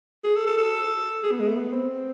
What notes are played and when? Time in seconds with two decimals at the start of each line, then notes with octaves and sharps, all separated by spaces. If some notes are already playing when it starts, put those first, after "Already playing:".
0.24 G#4
0.36 A4
0.46 A4
0.57 A4
1.23 G#4
1.31 B3
1.40 G#3
1.48 A3
1.56 B3
1.73 C4